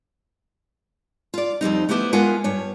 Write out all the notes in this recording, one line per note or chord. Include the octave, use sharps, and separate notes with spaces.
F4 D5
F2 G3 C4 D#4
A3 B3 E4 G4 C5
G#3 B3 F4 A#4 F#5 G#5
G2 C#5